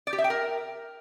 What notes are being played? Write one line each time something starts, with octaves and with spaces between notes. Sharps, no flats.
D5
G4
E5
G5
A#4